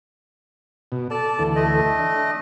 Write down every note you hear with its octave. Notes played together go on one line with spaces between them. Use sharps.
B2
A4 D5 A5
D2 E3 A4
A3 D#5
D4